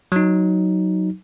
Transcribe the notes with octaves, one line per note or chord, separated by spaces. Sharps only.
F#3 D#4